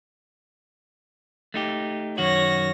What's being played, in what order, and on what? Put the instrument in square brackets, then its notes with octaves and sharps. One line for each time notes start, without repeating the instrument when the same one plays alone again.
[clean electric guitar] A3 D#4 G4
[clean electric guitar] F#2 D#3 F#4 [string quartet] C#5 A#6